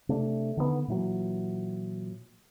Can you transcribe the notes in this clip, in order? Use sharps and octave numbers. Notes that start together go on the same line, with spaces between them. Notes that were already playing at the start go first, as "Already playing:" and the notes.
C3 A3 D4
D3 D#3 G#3 B3
A#2 E3 F#3